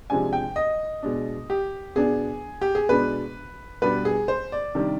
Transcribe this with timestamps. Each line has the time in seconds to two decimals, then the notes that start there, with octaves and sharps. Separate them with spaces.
0.10 C3 F3 G#3 D4 G#5
0.33 G5
0.56 D#5
1.03 B2 G#3 D4
1.50 G4
1.95 B2 B3 D4 G#4
2.61 G4
2.75 G#4
2.89 B2 G#3 D4 B4
3.82 B2 G3 B3 D4 B4
4.05 G#4
4.28 C5
4.52 D5
4.75 C3 D#3 G3 D4